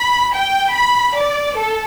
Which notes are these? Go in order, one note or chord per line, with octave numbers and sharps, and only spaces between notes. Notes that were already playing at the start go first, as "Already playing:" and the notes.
Already playing: B5
G5
B5
D5
A4